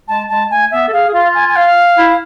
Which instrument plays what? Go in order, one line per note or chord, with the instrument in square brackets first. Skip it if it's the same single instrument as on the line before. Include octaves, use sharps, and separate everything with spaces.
[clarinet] G#3 [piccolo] A5
[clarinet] G#3 [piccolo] A5
[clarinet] A3 [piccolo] G#5
[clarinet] B3 [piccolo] E5
[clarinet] A4
[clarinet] G#4 [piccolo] F5
[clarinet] G#4
[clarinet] F4 [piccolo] F5
[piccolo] G#5
G#5
F5
[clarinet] E4